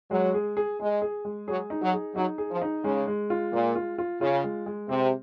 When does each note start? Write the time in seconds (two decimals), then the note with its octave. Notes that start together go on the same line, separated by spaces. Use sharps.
0.11 F#3 G#3
0.34 G#4
0.57 G#4
0.80 G#3 G#4
1.02 G#4
1.25 G#3
1.48 F#3 G#4
1.70 D#4
1.82 F#3
1.93 G#4
2.16 F#3 D#4
2.38 G#4
2.50 F3
2.62 D#4
2.84 C#3 G#3
3.07 G#3
3.30 F4
3.52 A#2 G#3
3.75 F4
3.98 F4
4.21 C#3 F4
4.44 G#3
4.66 G#3
4.89 C3 C4